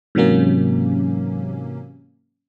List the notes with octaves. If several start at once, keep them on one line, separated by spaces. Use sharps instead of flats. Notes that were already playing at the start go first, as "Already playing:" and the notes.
G#2 C3 E3 F#3 A#3 C#4